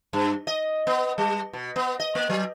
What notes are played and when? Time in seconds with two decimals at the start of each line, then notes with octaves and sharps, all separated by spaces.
0.13 G2
0.47 D#5
0.87 B3
1.18 G3
1.53 B2
1.76 B3
2.00 D#5
2.15 A#3
2.30 F#3